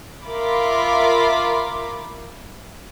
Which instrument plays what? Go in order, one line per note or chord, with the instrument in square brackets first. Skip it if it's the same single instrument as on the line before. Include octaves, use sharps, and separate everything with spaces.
[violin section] F4 A#4 E5 B5 D6